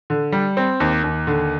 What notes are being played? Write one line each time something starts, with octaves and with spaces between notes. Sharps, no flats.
D3
G3
C4
D#2
D#2
D3